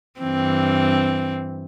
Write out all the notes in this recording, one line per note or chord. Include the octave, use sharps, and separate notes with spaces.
G2 E3 C4